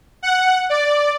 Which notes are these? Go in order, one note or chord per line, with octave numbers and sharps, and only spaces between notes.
F#5
D5